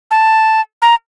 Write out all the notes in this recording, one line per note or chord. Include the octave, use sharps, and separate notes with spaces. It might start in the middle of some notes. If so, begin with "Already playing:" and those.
A5
A#5